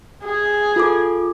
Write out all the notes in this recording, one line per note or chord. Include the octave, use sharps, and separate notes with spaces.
G#4
F4 A4 D6